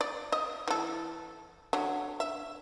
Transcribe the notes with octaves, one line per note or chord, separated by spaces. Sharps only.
D5
D#5
E3 A4
D3 F#3
E5